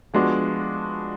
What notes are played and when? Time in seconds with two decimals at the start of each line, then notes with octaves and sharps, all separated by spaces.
0.14 F3 G#3 B3 D4 F#4